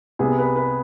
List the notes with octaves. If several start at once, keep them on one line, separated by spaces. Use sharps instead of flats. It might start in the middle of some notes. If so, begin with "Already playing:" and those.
C2 C3 G3 B3 G#4
B4
B4